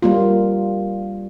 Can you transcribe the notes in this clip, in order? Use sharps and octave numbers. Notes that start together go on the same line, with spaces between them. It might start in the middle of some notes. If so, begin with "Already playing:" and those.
G3 A#3 F4